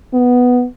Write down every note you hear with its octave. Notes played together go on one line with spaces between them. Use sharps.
B3